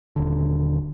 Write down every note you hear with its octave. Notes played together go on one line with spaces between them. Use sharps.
D#1 D3